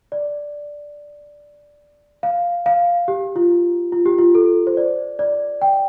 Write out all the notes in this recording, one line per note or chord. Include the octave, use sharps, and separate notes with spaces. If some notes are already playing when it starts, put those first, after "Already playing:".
D5
F5
F5
G4
F4
F4
G4
F4
A4
C5
D5
D5
G5